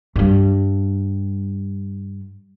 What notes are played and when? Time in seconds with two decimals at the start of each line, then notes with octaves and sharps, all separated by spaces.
0.16 G2 G3